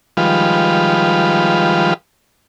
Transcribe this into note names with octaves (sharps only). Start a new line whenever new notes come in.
D#3 F3 G3 G#3 F4 B4